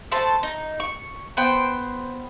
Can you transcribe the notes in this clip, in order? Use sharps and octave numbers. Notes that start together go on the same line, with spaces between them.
A3 C5 A5
D#4
C#6
B3 C5 G5